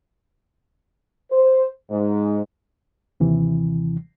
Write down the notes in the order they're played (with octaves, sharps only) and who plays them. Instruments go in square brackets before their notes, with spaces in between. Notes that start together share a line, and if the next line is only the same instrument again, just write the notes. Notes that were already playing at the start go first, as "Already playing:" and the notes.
[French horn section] C5
G#2
[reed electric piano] D#2 C3 E3